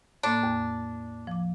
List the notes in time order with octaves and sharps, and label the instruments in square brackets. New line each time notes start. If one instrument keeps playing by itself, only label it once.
[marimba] A2 A#3 [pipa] D4
[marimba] E2
F3 D6